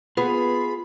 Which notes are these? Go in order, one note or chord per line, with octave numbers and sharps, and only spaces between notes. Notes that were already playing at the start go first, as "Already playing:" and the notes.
B3 F4 G#4 B5